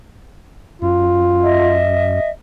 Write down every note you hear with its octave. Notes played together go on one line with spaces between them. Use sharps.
F#2 F4
D#5 E5